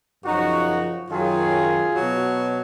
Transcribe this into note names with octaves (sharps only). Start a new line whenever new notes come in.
F#2 C#3 F3 D#4 F#4
F#2 D#3 F#3 F4 G#4
B2 F#3